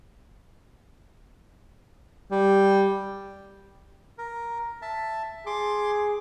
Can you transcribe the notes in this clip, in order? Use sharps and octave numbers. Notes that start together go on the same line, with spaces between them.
G3
A#4
E5 A5
G#4 C6 D6